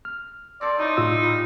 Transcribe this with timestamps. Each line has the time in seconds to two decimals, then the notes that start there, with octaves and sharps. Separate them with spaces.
0.05 F6
0.61 C4 A4 C5 D5
0.79 F#3 D#4 E4 C6
0.97 A2 G#3 F4 D5 E6
1.24 G3